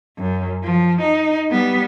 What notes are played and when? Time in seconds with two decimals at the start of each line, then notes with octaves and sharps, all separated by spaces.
0.18 F#2
0.64 F3
1.02 D#4
1.51 G3 B3